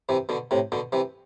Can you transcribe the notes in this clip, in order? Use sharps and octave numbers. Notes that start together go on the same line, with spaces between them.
C3 E3
B2 D3
A2 C3
B2 D3
C3 E3